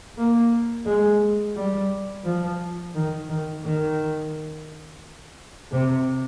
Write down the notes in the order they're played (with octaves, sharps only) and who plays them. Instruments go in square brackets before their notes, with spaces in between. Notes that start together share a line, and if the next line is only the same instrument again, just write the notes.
[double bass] A#3
G#3
G3
F3
D#3
D#3
D#3
C3